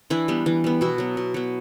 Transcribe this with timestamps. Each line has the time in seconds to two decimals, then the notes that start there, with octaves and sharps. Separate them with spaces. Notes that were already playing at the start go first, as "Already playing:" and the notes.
0.10 E3 D4 E4
0.28 G3 B3
0.46 E3
0.64 G3 B3
0.81 B2 E4 F#4
0.98 F#3 B3
1.17 B2
1.34 F#3 B3